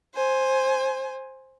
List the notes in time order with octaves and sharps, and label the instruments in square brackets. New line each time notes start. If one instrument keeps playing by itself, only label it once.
[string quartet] C5 G#5